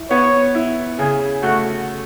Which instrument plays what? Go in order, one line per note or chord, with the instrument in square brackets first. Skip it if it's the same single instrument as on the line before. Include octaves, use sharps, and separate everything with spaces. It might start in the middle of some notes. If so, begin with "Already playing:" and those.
Already playing: [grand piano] E4
[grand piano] B3 [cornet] C#5
[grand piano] E4
[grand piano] C#3 [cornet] G#4
[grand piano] A3 [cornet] F#4